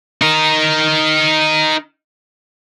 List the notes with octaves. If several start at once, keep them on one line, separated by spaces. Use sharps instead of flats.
D#4 A#4